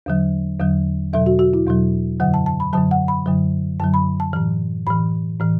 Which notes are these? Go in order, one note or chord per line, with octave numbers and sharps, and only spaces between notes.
E2 D3 F#3
E2 D3 F#3
E2 B2 F#3 E5
F#4
F#4
E4
E2 B2 F#3
F#2 D3 F#3 F#5
A5
A5
B5
F#2 D3 F#3 A5
F#5
B5
F#2 D3 F#3
F#2 D3 F#3 A5
B5
A5
A2 E3
A2 E3 B5
A2 E3